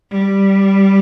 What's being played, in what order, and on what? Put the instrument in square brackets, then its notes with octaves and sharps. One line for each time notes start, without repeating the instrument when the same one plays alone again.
[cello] G3